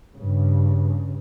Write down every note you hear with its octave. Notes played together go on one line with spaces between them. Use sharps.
G2 C#3